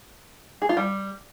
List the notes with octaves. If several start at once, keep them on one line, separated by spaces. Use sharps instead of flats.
G#4
F4
G3